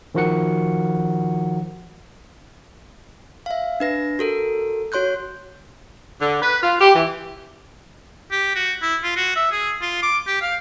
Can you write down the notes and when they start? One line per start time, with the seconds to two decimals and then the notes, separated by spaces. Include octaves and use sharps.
0.15 D#3 F3 F#4 A#4 F#5 C#7
3.46 E5 F5
3.80 D4 B4 A#6
4.19 F#4 A4 A#4
4.92 F#4 C#5 C6 F#6 G6
6.21 D3
6.42 B4
6.62 F4
6.81 G4
6.94 E3
8.31 G4
8.55 F#4
8.82 E4
9.03 F4
9.16 F#4
9.36 E5
9.52 G#4
9.82 F4
10.03 D6
10.27 G4
10.41 F5